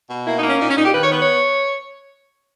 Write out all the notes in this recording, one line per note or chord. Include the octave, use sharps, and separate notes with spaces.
B2
A#3 E4
D#4
A#3
C#4
A#2 D#4
C#4
A#2 D#4
G4
D#3 B4
C#5
B3 B4
C#5